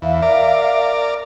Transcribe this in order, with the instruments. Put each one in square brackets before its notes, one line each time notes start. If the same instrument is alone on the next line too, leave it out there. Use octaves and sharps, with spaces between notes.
[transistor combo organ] E2 [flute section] E5 F5
[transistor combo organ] A#4 D5